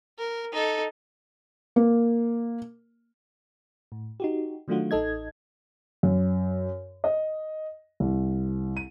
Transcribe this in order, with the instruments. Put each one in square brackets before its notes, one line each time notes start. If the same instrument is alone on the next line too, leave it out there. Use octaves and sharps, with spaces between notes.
[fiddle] A#4
D#4 A4
[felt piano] A#3
[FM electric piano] A2
D#4 F#4 G4
D#3 F#3 A3 D4 F4 F#4
A1 D#4 A4 D#5 G#6
[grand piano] F#2
D#5
C2
D#7